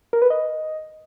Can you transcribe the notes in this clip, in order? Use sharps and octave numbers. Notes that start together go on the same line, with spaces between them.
A#4
B4
D#5